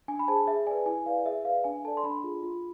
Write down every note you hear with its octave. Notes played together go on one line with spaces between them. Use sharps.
D4 G#5
B5
G#4 C5 A5
G#4 E5
B4 D5 G#5
E4 G#5
B4 D5 F5
G#4 E5
B4 D5 F5
D4 G#5
A4 D5 A5
C6
D4 B5
F4 G#4
F4